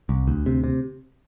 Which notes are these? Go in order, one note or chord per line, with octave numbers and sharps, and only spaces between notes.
C2
D2
C3
C3